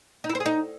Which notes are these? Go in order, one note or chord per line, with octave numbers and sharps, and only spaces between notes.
D#4
E4
C5
G#4
D#4